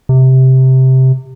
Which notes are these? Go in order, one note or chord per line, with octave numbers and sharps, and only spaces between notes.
C3